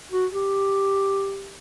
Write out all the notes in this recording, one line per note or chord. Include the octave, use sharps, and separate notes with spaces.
F#4
G4